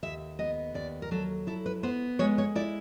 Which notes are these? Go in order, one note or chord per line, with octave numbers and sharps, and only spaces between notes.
D#2 E5
B3 D#5
D#2 D5
A#4
F#3 A4
E4 A4
B4
B3 C5
G#3 C#5
C#5
E4 D5